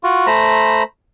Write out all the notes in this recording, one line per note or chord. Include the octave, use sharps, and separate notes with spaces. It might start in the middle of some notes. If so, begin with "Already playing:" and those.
F4 F#4
A3 C5 A#5 B5